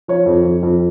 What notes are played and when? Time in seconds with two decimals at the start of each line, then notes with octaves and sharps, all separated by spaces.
0.08 F3 C#5
0.26 F2
0.45 F2
0.63 F2